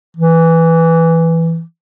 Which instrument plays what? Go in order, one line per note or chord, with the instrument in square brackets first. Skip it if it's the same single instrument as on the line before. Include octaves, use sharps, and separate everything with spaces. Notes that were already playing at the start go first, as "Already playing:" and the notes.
[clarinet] E3